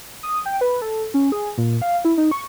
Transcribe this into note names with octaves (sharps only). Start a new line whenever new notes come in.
D#6
G5
B4
A4
C#4
G#4
A#2
F5
E4
D#4
C#6